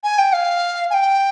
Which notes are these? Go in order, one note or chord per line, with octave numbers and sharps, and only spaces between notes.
G#5
G5
F5
G#5
G5